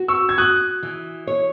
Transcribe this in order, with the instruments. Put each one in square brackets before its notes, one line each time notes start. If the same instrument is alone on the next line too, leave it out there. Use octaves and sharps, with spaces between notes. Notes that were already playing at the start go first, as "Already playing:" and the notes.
Already playing: [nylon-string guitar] F#4
[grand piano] C#6 E6
G#6
[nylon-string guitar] F#4 [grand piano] D#6 F#6
[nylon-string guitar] E3
C#5